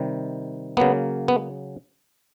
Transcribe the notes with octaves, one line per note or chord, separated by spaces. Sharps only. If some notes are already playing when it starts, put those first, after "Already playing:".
Already playing: C3 D#3 G3
C#3 F#3 A#3 B3
B3